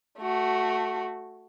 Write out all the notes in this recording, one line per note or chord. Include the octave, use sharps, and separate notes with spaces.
A3 F#4